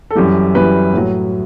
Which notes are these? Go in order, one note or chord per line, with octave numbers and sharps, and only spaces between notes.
A4
F#2 E3 G3 G4
F#2 E3 G3 B4
A2 F#3